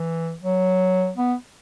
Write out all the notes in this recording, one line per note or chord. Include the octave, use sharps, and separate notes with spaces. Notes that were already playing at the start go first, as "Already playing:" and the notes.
Already playing: E3
F#3
B3